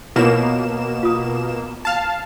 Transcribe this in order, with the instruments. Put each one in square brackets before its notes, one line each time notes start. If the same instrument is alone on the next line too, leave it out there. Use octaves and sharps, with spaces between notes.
[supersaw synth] B2 A#3 E7 [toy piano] E4 F4 C#5
[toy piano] F4 D#6
[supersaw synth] F5 A5